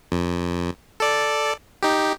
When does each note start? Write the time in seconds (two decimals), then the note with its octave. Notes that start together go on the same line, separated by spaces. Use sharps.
0.12 F2
1.00 A4 D5
1.83 D#4 G4